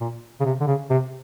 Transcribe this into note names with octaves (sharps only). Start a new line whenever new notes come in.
A#2
C#3
C3
D3
C#3
C3